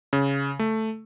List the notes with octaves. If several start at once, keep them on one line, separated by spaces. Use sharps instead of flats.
C#3
A3